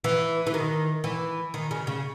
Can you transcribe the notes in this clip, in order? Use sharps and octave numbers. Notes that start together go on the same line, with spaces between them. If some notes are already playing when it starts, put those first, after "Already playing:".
E3
E3
D#3
E3
D#3
C#3
C#3